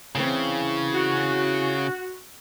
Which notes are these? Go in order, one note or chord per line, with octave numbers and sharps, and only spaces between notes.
E2 C#3 E3 C4
F#4